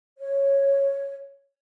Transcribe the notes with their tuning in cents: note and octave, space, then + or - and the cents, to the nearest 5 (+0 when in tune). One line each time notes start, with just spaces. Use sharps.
C#5 -5